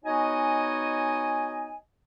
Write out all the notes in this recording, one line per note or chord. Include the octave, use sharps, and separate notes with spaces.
B3 D#4 F#4 C#5 D#5 G#5